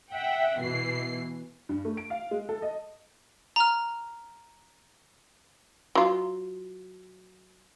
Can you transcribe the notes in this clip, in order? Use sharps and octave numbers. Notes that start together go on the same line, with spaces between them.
E5 F#5 G5
B2 E3 C7
G2
A3
D7
F5
G#3
A4
D#5
A#5 F6
F#3 F4